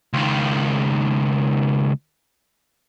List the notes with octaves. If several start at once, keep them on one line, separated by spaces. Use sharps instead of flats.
C#2 D#3